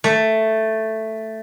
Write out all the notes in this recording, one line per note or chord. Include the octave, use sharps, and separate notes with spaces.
A3